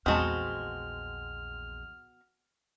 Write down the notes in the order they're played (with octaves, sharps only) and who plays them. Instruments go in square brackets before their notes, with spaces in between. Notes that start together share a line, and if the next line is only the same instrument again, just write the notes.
[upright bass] A#1 E2 [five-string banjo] G#3 C4 [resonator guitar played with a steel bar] B3 F#4 A5 [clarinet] F6